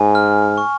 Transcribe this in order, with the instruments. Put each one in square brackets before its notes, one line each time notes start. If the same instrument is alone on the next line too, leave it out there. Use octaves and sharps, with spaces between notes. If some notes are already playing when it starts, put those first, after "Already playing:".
Already playing: [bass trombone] G#2 [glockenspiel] G#5
[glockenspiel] F6
C#6